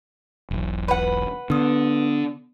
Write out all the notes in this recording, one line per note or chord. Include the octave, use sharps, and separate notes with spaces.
E1 B1
B4 F#5
D3 B3 D#6